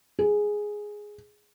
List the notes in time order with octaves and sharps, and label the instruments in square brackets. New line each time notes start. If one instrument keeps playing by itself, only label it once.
[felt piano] G#4